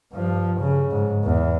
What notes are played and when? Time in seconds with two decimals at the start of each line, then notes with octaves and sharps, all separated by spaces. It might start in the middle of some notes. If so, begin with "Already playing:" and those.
0.12 G2 F3
0.61 C#3
0.91 G#2
1.24 E2